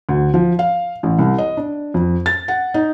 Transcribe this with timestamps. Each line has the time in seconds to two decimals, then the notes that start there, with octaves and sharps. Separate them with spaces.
0.09 D2
0.34 F3
0.59 F5
1.03 A1
1.19 C2
1.38 D#5
1.57 D4
1.94 F2
2.26 A6
2.48 F#5
2.74 D#4